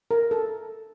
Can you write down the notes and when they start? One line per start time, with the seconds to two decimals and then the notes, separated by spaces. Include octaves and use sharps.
0.11 A#4
0.31 A4